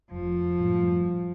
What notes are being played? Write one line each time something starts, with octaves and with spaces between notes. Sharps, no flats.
F1 F3
F#2 A2 G3